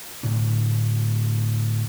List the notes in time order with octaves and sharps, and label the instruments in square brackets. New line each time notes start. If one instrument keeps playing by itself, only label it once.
[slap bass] A2 D3 D4